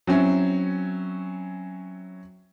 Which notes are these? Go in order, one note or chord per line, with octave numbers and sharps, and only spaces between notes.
F#3 C4 C#4 E4